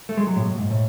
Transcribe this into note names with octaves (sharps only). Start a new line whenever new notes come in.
A3
G#3
F#3
A2
A2
G#2
A2